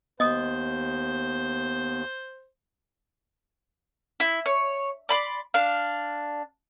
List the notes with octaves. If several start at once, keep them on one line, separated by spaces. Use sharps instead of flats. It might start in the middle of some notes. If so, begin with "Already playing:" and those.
D#2 B3 C5 D#5 D#6
E4
C#5
D5 B5 C6
D4 F5